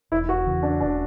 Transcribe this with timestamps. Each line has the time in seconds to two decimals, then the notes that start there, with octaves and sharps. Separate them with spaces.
0.12 E1 E4
0.29 F#4
0.46 E2 C#3
0.63 D4
0.81 E1 D4